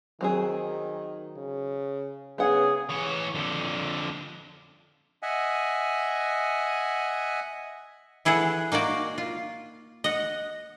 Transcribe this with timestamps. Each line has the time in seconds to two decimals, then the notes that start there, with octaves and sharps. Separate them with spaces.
0.21 D#3 F#3 C4 G#4
1.36 C#3
2.38 C#3 B3 G#4 F#5
2.90 E3 C#5
3.35 F2 D3
5.22 D#5 E5 F#5 G#5
8.25 E3 E4 G#4 A4 F#5
8.72 A#3 D#4 F#4 D5 G5
9.18 F4
10.04 D#5 F#5